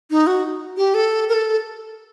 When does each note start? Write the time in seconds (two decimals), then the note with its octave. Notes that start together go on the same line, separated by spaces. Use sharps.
0.11 D#4
0.27 F#4
0.77 G4
0.94 A4
1.29 A#4
1.34 A4